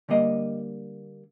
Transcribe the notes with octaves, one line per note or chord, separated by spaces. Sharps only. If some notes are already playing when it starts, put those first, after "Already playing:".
D3 G3 A#3 D#5